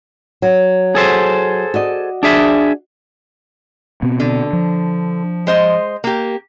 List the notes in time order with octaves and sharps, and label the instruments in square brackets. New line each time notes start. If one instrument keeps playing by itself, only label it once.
[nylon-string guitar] F#3
[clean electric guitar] G#4 A4 C5
[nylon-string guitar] F#4 D5 D#5
[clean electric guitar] D4 G#4 E5
[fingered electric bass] B2 B3 C4
[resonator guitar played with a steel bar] D3
[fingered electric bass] F3
[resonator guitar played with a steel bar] G#3 C5 D#5
A#3 G4